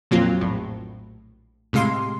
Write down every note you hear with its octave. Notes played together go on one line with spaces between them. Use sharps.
F2 A#2 F#3 A#3 C4 F4
A#1 A2
A2 C3 G#3 F5 C6